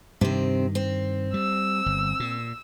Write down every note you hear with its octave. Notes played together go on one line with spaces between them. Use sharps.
G2 C3 D#3 C4
C4
G3 E6
G1
A#2